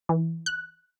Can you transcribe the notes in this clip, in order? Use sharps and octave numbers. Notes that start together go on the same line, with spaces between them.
E3
F#6